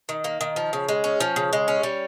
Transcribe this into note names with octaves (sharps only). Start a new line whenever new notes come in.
D#3
A#3
D#3
F3
C#3
G#3
C#4
F3
C#3
G#3
C#4
G3